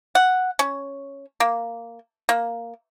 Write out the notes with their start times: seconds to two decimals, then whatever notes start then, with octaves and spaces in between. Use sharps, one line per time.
0.15 F#5
0.59 C#4
1.40 A#3
2.29 A#3